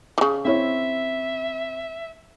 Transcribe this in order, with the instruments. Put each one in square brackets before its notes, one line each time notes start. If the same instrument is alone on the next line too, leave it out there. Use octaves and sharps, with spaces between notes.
[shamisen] C#3 E3
[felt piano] C4 E4 C#5 [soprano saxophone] E5